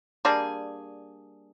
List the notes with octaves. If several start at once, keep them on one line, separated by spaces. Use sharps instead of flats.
G3 A#3 D4 G#4